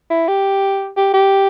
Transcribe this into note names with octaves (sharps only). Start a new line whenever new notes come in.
E4
G4
G4
G4